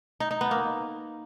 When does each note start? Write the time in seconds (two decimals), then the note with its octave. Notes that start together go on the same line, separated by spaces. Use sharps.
0.20 D#4
0.31 D#4
0.41 B3
0.51 A#3